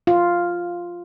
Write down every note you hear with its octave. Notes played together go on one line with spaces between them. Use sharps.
F4